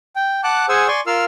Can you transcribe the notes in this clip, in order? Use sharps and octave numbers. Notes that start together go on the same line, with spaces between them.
G5
F#5 A5 D6 F#6
G#4 C5 F#5 G#5 E6
D5 G#5 C6 C#6
F4 A#4 F5 E6 F6